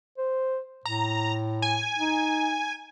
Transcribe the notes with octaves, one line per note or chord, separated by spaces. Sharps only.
C5
A2 A#5
G#5
D#4